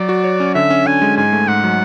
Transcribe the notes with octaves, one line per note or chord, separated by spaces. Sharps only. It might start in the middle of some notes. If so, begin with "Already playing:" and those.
Already playing: F#3 D5
F#4
C#5
C#4
D3 E5
C#4
D3 G#5
G#3
G#2 G#5
A3
G#2 F#5
F#3